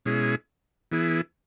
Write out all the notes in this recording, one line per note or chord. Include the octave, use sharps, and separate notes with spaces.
B2 G#3 C#4 E4 G#4
E3 B3 E4 G#4